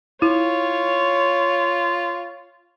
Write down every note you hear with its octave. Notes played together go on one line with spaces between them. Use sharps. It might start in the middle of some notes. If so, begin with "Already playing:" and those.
E4 F4 C#5